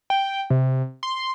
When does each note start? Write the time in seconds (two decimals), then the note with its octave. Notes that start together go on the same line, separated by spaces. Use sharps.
0.10 G5
0.50 C3
1.03 C6